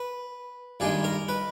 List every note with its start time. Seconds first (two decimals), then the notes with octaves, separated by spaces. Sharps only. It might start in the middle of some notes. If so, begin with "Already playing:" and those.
Already playing: B4
0.80 G2 D#3 G#3 G#4
1.04 A#4
1.28 B4